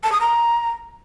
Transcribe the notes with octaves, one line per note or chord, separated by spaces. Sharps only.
A5
D#6
A#5